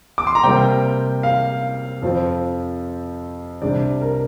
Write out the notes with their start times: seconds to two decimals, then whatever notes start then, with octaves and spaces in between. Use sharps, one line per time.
0.18 D6
0.27 C6
0.35 A#5
0.43 C3 G3 A#3 G5
1.23 F5
2.02 F2 F3 C4
3.62 C2 C3 G3 D4 D5
4.02 A#4